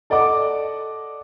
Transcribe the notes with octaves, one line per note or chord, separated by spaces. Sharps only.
A4 D5 D#5 F#5 D6